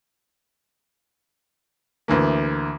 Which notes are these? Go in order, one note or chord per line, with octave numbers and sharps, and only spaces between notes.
D2 E3 A#3